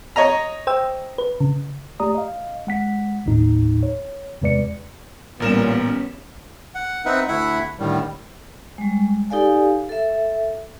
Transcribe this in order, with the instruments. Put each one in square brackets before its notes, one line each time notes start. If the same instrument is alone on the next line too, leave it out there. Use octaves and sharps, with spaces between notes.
[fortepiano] C#5 D#5 A#5
[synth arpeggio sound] C5 G5 E6
B4
C#3
[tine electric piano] A3 G4 D5 A#5 D#6
D#5 F5
G#3 F#5 B6
G1 D#2 A2 D#4
C#5
E2 C3 G#3 B4 D5 C#7
[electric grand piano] A1 A#4 E7 [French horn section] A#2 [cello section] G3 B3 C#4
[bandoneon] F#5
C4 D#4 B4 E5 F#5
D2 A3 E4 E5 F#5 B5
A2 D3 D#3 G3
[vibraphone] G3 G#3
D#4 G4 A4 D5 F5 G#5
A4 E5